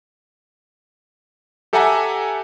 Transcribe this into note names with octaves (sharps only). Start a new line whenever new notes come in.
G4 A4 E5 F#5 G#5 A#5